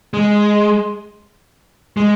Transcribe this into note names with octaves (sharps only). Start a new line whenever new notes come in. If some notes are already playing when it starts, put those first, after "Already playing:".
G#3
G#3